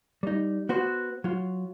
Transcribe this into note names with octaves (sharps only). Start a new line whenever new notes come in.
G3 D#4
B3 F#4 C5
F#3 F4